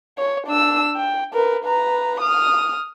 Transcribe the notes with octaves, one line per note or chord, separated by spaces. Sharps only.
C#5
D4 E6
G5
A#4 B4
B4 A#5
D#6 F6